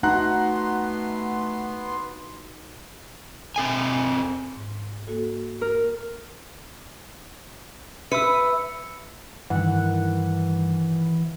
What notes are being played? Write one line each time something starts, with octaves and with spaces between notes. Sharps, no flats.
A3 B3 D#4 F#4 F#5 A#5 C6 F#6
C4 A4 G#5
G#2
A#3 F#4 A4
A#4
B4 E5 E6 C#7
G2 D#3 E3 F#5